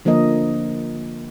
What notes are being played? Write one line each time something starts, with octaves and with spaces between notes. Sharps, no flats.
D3 F3 A#3 A#4 D#5